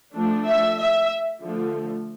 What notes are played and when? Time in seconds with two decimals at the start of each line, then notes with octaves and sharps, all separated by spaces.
0.15 F3 A3 D4
0.47 E5
0.79 E5
1.43 D3 F3 A3